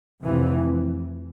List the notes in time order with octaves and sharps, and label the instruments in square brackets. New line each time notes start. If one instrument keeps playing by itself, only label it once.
[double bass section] F1 F2 C3 E3